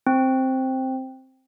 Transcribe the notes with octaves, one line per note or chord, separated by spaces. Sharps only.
C4